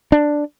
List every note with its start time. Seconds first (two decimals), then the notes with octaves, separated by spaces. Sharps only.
0.12 D4